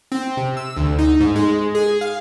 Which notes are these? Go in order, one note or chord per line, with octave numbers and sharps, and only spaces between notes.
C4
C3
E6
D2
D#4
G#2
G#3
G#4
F5